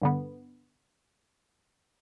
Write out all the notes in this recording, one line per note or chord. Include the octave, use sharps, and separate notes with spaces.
G2 D3 B3